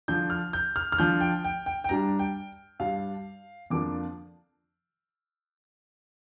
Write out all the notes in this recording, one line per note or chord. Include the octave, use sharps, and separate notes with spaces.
D3 F3 D4 G6
F6
G6
F6
F6
D3 F3 D4 G6
G5
G5
G5
G5
G2 G3 D4 A#5
G5
G2 G3 D4 F5
F2 D3 F3 A#3 D4 D6